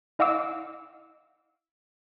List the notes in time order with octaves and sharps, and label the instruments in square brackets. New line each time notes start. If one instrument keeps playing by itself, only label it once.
[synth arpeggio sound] E4 D#5 F5 F#5 D6 E6